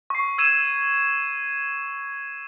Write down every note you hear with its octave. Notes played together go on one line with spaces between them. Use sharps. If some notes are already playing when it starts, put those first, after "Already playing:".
C#6 C7
E6 G#6 D#7 E7